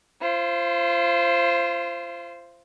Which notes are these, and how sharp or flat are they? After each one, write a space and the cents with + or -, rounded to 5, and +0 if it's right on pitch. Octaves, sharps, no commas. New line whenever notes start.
F4 -30 C5 +5